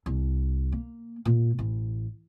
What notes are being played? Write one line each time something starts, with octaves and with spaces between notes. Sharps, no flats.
C2
A#3
A#2
A1